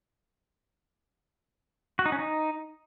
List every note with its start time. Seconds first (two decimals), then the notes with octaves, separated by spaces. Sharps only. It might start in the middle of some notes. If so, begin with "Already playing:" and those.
1.99 F#4
2.06 D#4
2.12 C#4
2.19 D#4